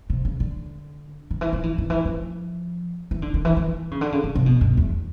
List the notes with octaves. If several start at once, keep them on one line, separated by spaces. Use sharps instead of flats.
C3
C#3
D3
D#3
E3
F3
E3
D#3
E3
F3
E3
D3
D#3
E3
E3
C#3
D3
C#3
C#3
C3
B2
F#2
E2